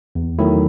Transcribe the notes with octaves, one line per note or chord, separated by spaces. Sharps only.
E2
D#3 F#3 A3 E4